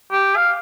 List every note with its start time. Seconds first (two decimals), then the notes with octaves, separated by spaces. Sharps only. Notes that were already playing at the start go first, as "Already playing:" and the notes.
0.11 G4
0.36 F5